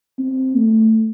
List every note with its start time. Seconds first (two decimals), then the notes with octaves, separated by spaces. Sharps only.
0.19 C4
0.56 A3